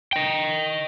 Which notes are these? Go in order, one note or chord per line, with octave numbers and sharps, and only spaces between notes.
D#5 G5